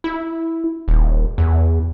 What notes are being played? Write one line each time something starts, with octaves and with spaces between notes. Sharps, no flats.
E4
D#1
E2